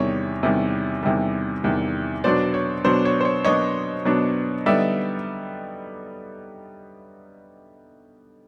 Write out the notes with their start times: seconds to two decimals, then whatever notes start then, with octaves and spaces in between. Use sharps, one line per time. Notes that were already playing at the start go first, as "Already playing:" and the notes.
Already playing: E2 C3 D#3 G3 C#5
0.43 E2 C3 D#3 G3
1.03 E2 C3 D#3 G3
1.64 E2 C3 D#3 G3
2.24 B2 F#3 B3 D4 C5 D5
2.54 C#5
2.84 B2 F#3 B3 D4 C5
3.05 C#5
3.21 C5
3.25 C#5
3.45 B2 F#3 B3 D4 C#5 D#5
4.05 B2 F#3 B3 D4
4.66 D3 G3 B3 D#4 D5 E5